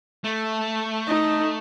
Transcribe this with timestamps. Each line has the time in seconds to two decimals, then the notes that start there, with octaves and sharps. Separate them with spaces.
0.24 A3
1.08 D#4